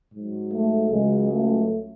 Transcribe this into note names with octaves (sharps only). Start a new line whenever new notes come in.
G#2 F#3
A3
C#2 C#3 F#3 G#3
A3